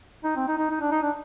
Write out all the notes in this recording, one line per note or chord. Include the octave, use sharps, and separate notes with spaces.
D#4
C4
D#4
D#4
D#4
D4
D#4
D4